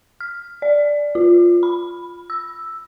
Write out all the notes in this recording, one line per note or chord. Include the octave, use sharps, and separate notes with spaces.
F6
D5
F4
B5
E6